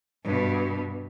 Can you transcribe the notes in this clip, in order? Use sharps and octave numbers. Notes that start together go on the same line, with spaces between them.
G2 B2